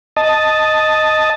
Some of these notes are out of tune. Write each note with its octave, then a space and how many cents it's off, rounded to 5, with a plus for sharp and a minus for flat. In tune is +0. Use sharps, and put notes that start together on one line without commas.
D#5 +0 A5 +0